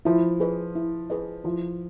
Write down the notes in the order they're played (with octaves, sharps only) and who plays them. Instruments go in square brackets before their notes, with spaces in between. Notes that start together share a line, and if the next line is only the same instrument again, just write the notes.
[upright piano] F3 [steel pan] E4
[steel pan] G#4 B4 D#5
E4
G#4 B4 D#5
[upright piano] F3 [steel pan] E4